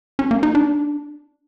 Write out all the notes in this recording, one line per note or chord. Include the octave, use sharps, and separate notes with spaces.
C#4
A#3
D#4
D4